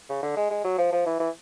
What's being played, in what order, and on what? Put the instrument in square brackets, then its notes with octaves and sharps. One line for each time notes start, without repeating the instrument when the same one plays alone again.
[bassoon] C#3
D3
G#3
G#3
F#3
F3
F3
E3
E3